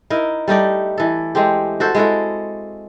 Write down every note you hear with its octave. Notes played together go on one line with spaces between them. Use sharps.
D#4 E4 A#4
G3 A3 D#4 D5
E3 A4
G#3 A3 C4 G4
F#4 A4 C5
G#3 E4 F#4 A4